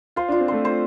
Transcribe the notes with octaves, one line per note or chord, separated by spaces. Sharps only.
F4 C5
D4 F4
C4
A3 C5
C5